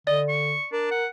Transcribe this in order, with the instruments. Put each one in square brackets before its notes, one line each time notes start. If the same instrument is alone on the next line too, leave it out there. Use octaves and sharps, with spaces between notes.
[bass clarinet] D3 [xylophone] D5 [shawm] D#5
[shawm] C#6
[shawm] D4 [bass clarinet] A#4
[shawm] F#5